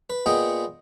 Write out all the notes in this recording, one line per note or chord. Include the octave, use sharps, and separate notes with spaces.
B4
A#2 B3 G#4 D#5 G5